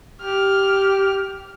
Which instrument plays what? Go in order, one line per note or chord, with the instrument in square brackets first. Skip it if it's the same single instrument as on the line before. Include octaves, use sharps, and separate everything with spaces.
[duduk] G4 [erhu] F6